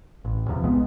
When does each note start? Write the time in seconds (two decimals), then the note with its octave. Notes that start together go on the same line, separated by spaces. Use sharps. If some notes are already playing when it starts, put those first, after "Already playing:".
0.25 A1
0.48 E2 C3 F3
0.64 B1 G#3 B3